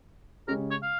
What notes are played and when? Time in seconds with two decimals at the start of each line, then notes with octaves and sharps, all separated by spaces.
0.48 C#3 G#3 C#4 G4 A#4
0.71 C#5
0.83 F5